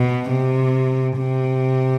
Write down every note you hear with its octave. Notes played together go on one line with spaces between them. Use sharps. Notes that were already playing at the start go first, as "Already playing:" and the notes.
Already playing: B2
C3
C3